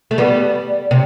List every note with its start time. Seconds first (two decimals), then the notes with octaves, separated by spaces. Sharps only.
0.11 A3
0.18 G3 B3 D5
0.91 C3